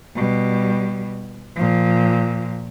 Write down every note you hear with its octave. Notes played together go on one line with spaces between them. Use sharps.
B2 G3
A#2 F3